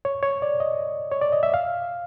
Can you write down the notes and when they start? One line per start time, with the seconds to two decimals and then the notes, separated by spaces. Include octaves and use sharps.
0.05 C#5
0.23 C#5
0.42 D5
0.60 D#5
1.12 C#5
1.22 D5
1.32 D#5
1.43 E5
1.54 F5